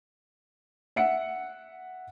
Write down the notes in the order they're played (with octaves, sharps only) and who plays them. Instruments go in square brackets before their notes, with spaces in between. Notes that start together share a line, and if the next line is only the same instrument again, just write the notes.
[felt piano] E5 F#5 C#7